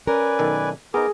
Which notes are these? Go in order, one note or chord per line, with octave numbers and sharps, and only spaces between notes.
C#4 A#4 B4 D5 G#5
B1 D#3 A4
B3 D#4 G#4 A#4 D6